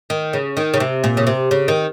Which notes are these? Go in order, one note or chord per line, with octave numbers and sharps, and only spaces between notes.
D#3
C#3
D#3
C#3
C3
A#2
C#3
C3
C#3
D#3